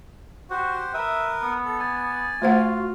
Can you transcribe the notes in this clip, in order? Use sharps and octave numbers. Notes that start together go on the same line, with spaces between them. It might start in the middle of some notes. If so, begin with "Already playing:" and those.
F#4 G4 C5 F#5
A#4 B4 E5 D#6
B3
A4
D5 G#5
A3 F4 F#4 C5 F#5